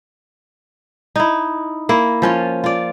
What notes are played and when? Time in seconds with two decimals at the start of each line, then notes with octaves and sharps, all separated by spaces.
1.16 D#4 E4
1.89 A#3 E4
2.22 F3 C#4 F4
2.64 F4 D5